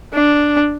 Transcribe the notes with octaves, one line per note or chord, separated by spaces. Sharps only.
D4